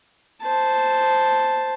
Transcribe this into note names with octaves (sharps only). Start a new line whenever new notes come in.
C5 A5